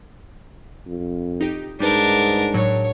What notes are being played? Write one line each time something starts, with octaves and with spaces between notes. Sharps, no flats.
F2
D#4 G4
G#2 G3 D4 D#4 A#4 B4
A2 F#3 C#5